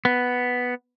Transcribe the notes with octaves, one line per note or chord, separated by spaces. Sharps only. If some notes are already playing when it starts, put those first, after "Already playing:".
B3